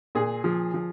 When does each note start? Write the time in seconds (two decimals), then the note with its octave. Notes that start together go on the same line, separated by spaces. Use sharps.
0.15 A#2 G#4
0.44 F3
0.74 F3